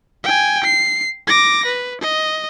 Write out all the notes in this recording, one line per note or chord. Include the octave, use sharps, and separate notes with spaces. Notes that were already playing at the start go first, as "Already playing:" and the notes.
G5 G#5
C7
D6 A#6
B4
D#5